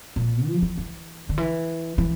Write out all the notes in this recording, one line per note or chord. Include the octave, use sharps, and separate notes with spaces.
A#2
F3
E3
E3
D3
E3
E3